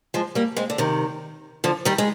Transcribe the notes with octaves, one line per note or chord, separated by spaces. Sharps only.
F3 G#3
G3 A#3
G#3 C4
D3
C3 D#3
D3 F3
D#3 G3
G#3